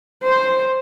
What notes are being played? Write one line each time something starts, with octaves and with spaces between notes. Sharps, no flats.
C5